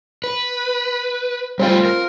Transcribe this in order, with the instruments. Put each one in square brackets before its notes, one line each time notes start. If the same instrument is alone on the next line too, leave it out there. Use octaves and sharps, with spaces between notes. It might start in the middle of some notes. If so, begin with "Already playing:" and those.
[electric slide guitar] B4
[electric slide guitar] G3 A3 G5 [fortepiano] C4 F4
[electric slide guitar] A#4